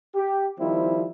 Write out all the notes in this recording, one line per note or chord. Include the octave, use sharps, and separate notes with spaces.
G4
D#3 F3 G3 C4 E4